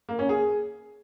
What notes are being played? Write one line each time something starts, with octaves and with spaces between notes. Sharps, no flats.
A#3
C#4
G#4